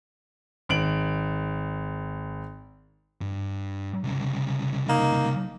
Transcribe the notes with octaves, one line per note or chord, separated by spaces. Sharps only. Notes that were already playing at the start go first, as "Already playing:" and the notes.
G#1 D7 F#7
G2
C2 C#3
A#3 D#4